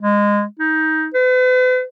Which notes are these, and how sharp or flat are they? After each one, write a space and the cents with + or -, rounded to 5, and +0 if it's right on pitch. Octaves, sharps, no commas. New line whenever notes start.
G#3 -20
D#4 +15
B4 +45